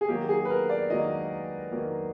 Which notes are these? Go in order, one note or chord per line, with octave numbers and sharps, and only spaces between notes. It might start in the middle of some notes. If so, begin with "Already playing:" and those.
G#4
D#3 F#3 A#3 G4
G#4
B4
A#4
D5
D#3 F#3 A#3 D#5
D#3 F#3 A#3